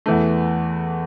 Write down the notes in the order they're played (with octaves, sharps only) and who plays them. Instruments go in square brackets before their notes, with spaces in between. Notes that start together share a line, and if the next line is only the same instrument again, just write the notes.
[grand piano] E2 E3 A3